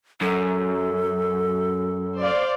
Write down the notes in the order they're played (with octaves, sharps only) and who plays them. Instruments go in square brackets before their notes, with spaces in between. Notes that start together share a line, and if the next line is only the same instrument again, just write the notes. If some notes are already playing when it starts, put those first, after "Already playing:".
[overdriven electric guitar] F#2 [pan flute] A4
[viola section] C5 D5 F5